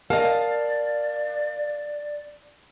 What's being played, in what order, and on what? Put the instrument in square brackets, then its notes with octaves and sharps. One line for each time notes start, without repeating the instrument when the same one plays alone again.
[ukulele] A#4 D#5 [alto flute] D5 [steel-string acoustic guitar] F5 A5